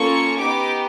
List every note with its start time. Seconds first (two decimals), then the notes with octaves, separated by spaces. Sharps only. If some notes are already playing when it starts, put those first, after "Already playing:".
Already playing: A#3 C#4 F4 A4 C#6
0.39 B3 D#4 G4 D6